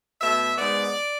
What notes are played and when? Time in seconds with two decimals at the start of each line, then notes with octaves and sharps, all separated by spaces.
0.21 B2 A3 E5
0.58 G#2 G#3 B3 D5